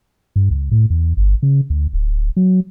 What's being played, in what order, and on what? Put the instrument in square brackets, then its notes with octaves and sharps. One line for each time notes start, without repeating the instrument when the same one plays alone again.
[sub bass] G2
C#2
A2
E2
G1
C#3
D2
D1
F#3